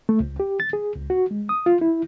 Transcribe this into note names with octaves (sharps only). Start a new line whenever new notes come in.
A3
C#2
G4
A6
G#4
C#2
F#4
G#3
D#6
F4
E4